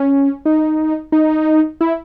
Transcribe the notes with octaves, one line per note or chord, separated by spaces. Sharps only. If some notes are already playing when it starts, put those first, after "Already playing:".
Already playing: C#4
D#4
D#4
E4